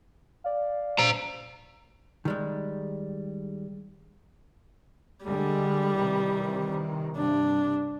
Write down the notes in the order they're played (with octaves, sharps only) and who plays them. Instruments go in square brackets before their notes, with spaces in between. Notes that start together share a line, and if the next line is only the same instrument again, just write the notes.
[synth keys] D5 F5
[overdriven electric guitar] C5 A#5
[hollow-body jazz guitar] D#3 G3 G#3
[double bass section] D3 G#3 [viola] G3
[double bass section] C3 D#3 E3
[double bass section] G2 C3 [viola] D4